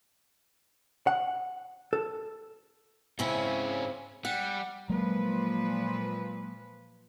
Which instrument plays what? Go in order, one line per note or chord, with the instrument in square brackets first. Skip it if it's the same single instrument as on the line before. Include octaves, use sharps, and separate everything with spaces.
[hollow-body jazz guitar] F#5
A4
[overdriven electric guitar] G#2 C#4 [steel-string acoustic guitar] C#3 C4 E4
[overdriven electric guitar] G3 [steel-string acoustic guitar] F#5
[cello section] A#2 F3 B4 [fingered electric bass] F#3 G#3 A#3